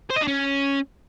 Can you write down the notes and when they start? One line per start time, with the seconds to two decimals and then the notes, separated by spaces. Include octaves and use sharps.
0.10 C5
0.16 D#5
0.22 D4
0.28 C#4